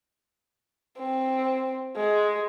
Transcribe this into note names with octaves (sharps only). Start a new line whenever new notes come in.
C4
G#3